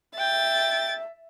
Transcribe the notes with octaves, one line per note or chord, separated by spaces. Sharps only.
E5 G5 A6